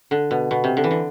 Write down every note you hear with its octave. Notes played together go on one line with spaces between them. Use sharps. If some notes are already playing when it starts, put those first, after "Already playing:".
D3
B2
B2
C3
D3
E3
D3